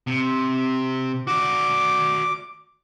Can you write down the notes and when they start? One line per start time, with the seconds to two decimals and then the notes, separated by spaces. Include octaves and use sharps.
0.07 C3
1.27 F#4 D5 D6